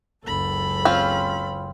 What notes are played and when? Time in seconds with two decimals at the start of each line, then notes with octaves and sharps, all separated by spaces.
0.24 F#1 C#2 A4 B5
0.85 C4 C#4 F4